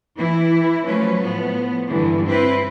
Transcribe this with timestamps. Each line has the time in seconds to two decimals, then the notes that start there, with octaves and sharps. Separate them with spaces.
0.18 E3 E4
0.86 F3 F#3 A3 C#4 B4
1.21 A2 F3 B3
1.88 G2 D3 E3
2.26 C4 E4 B4